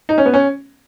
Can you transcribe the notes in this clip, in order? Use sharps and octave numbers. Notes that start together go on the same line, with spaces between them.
D#4
C#4
B3
C#4